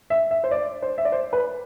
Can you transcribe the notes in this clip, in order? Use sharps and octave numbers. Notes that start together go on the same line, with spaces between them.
E5
E5
C5
D5
C5
E5
D5
C5
B4